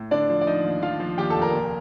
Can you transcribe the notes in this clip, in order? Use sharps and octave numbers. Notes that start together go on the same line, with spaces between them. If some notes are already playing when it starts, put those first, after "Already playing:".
Already playing: A2
D3 D4 D5
F3
D5
F3 D#4 D#5
D#2
F3 F4 F5
F3
D#2 G4 G5
A4 A5
F1
A#4 A#5
A#2